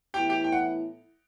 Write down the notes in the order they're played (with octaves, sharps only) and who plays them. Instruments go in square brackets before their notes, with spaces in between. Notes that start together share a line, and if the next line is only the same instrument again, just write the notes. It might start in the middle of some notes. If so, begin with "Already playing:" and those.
[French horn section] A2 E3 B3 E4 [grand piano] G4 G5
[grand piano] G4 G5
G5
F#5